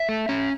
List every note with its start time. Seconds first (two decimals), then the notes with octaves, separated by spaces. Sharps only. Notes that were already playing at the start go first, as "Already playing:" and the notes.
Already playing: E5
0.09 A3
0.29 C#4